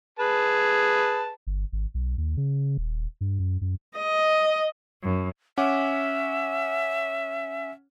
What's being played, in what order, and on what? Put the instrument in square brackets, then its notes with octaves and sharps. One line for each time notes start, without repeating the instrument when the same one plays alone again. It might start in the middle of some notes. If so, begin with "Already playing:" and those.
[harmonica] G#4 B4 A5
[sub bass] G1
G#1
B1
D#2
C#3
D#1
G2
F#2
F#2
[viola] D#5
[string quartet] F#2
[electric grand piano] C#4 F#5 D6 [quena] E5